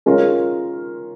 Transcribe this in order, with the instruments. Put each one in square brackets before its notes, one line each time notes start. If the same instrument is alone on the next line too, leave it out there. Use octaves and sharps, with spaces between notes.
[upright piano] G#3 C#4 F4 A#4